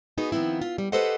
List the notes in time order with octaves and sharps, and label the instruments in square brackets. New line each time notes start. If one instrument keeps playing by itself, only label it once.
[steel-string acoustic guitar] B3 D#4 F#4 G#4 B4
D#3 F3 B3 C4 E4
F4
G3
G4 A4 B4 C5 D#5 F#5